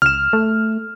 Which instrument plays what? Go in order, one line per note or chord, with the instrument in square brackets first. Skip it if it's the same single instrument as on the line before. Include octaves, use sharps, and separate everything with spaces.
[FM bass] C#2 [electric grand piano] F6 E7
[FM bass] A3